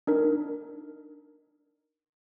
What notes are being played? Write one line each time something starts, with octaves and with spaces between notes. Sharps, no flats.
D4 D#4 A#4